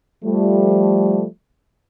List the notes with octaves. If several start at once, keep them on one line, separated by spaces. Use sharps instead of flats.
F3 G3 A3